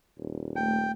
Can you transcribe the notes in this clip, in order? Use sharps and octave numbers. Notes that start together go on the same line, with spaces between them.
D#1
A3 G5